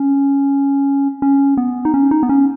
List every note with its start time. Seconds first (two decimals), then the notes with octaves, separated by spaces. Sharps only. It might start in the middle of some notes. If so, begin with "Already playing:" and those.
Already playing: C#4
1.22 C#4
1.57 B3
1.85 D#4
1.94 C#4
2.11 D#4
2.23 B3
2.29 C#4